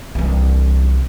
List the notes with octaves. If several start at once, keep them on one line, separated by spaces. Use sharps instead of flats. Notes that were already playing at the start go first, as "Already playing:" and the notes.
C2 E3